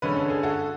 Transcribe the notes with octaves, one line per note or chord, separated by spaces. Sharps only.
D3 G#3 C#4 B4
A4
G#4
F#4 A4